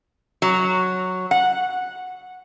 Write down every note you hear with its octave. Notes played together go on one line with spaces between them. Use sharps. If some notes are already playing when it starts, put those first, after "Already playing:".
F#3
F#5